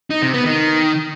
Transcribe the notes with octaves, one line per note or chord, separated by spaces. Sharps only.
D#4
C3
B3
D#3